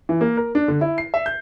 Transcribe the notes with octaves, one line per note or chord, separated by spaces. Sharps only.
E3
A#3
A#4
D4
D3
E4
C7
E5
G6